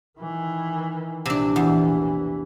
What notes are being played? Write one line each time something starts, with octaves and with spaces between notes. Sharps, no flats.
D#3 E3
A#1 C3 E3 D4
E2